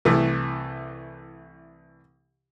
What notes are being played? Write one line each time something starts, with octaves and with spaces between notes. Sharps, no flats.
C2 E3 A3